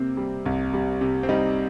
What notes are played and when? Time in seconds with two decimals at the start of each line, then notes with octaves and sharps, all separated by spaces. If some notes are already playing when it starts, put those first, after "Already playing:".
Already playing: C3 A#3 C4
0.17 G3
0.46 C2
0.74 G3
1.01 C3
1.23 C4
1.29 G3 D#4